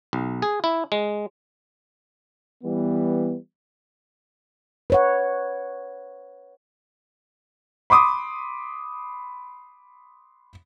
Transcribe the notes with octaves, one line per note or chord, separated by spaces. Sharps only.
B1
G#4
E4
G#3
E3 G3 B3
B4 C#5 F#5
B5 C6 D6 D#6